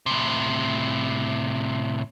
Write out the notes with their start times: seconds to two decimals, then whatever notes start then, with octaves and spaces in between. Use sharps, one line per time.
0.06 A2 C3